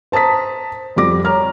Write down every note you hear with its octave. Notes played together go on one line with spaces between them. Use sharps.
C5 A5 A#5 D#6 B6
F2 G3 D6 A#6
C#5 A#5 F6